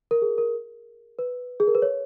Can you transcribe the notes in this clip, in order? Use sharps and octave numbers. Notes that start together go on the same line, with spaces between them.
A#4
G#4
A#4
B4
G#4
A#4
B4
C#5